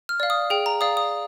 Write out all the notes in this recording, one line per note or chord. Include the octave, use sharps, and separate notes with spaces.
F6
D5 F5
D#6
G#4 G5
A#5
D5 F5 D#6
D#6